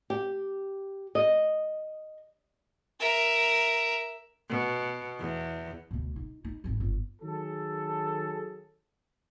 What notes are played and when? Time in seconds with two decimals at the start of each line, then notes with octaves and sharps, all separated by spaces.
0.10 G4
1.15 D#5
3.00 A#4 E5
4.49 B2
5.20 E2
5.91 D2 B2
6.16 D#4
6.45 D#4
6.64 G#1 F2
6.80 G1
7.22 D#3 F#3 G#4 A4